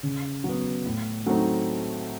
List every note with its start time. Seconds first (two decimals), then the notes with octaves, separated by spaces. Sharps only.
0.03 C#3
0.44 F#3
0.49 B3
0.86 A2
1.26 F#3 A3 C4 D#4